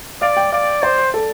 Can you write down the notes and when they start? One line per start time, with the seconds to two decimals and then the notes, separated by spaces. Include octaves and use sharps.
0.21 D5 F5
0.37 G5
0.52 D5 F5
0.83 C5 D5
1.14 A4